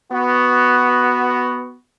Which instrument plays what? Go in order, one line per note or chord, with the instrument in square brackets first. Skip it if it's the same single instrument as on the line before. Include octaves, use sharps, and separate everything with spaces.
[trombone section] B3 F#4